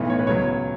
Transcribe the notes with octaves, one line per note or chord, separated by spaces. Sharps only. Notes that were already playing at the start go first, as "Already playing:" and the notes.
Already playing: B1 A2 E3 B3
C#5
B4
C#2 B2 F#3 C#5